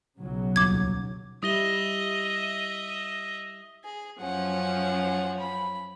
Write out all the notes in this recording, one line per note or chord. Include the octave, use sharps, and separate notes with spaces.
B1 C#3 F#3
D#1 C#2 D6 G#6
G3 E4 D#5 E5 D#6 A#6 G7
G#4
F#2 F3 C#4 F#5
B5